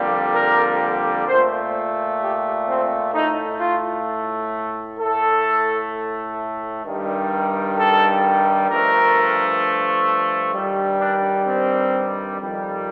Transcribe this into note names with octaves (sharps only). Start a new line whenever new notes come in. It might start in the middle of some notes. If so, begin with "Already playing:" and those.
Already playing: F2 D3 G3 A#3
A#4
A#2 A3 C5
G4
C4
A2 A3 D#4
F4
A2 A3 A4
G2 D#3 G3
A4
G2 F3 A3 A#4
G2 D#3 G3
D4
C4
F2 D#3 G3